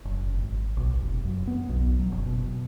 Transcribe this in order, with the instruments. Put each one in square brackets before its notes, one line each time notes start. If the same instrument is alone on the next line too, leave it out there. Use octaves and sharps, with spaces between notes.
[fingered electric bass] F#1
G#1
B1
F1
F#2
B3
B1
F#3
F#1
B2